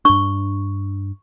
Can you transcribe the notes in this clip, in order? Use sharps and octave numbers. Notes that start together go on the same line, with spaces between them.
G2 D4 C#6